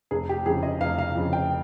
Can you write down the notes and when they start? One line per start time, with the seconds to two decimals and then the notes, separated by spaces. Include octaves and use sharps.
0.11 F1 G#4
0.29 G4
0.46 F2 C#3 G#4
0.63 D#5
0.81 F1 F5
0.98 F5
1.15 F2 C#3
1.33 G5